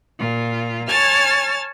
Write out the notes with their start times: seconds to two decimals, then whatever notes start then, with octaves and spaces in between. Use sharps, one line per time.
0.18 A#2 F4
0.88 C#5 G#5 A5 F6 A6